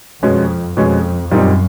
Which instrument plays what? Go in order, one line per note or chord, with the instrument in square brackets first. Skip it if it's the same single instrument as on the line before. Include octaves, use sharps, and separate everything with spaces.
[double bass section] F2 [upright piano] B2 G#3 C#4
[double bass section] F2 [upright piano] B2 G#3 C#4
[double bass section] F#2 [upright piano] A#2 G3 C4 D#4